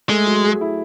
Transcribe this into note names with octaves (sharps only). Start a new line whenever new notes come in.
G#3 A3
F#3
G#4
E4